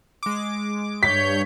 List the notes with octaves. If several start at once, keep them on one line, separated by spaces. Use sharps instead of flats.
G#3 D6
G2 C#5 G6 B6